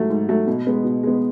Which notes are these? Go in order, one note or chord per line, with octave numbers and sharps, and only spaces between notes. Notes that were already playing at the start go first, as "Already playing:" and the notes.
Already playing: G#2 F#3 A3
G#2
F#3 A3
B2
G#3 B3
B2
G#3 B3